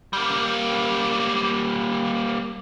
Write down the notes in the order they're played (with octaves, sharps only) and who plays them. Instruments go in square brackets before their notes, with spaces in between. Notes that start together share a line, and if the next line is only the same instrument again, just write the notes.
[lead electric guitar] G3 A#3